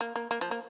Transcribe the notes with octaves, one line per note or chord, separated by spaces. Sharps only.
A#3
A#3
A#3
F3
A#3